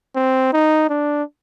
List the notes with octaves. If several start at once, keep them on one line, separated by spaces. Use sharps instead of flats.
C4
D#4
D4